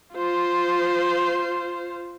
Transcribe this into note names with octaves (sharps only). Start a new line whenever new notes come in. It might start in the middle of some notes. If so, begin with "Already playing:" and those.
F4 C5